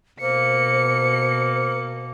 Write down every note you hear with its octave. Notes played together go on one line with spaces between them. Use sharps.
B2 A#3 C5 C#7